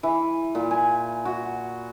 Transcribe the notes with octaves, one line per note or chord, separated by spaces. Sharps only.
E3
A#2
G#5
F#4